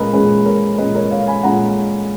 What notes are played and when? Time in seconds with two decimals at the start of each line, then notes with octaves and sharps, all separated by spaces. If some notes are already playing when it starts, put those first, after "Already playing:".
Already playing: A#2 G#3 C#4 A#4 B4 D#5
0.13 A#2 G#3 C#4 G#4 B4
0.45 A#4 C#5
0.78 A#2 G#3 C#4 B4 D#5
0.95 A#4 C#5
1.11 C#5 F5
1.27 G#5 B5
1.43 A#2 G#3 C#4 F#5 A#5